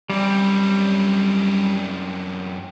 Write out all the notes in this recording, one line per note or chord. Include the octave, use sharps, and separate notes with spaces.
F#2 G3 C4